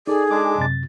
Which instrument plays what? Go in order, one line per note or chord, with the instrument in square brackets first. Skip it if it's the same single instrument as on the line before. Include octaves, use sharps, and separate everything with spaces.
[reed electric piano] D#4 A4 [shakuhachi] G#4 [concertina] D5
[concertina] G#3 D4 D6
[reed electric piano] F#2 C3 A6